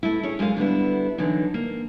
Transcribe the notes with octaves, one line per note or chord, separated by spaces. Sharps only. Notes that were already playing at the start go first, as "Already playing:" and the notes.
A3 E4
C#4 G#4 C#5
F#2 G#3 D#4 F5 G#5
D3 G3 B3 E4
D3 E3 F#3 D#4
A#3